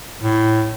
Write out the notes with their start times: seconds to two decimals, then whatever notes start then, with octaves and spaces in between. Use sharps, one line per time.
0.23 A2